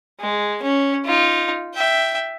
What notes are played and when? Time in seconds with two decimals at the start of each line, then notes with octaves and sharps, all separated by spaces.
0.20 G#3
0.62 C#4
1.05 D#4 F4
1.75 E5 G5